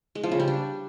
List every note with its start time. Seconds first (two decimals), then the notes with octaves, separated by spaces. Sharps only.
0.15 G#3
0.23 F3
0.31 C#3
0.40 G3
0.48 D4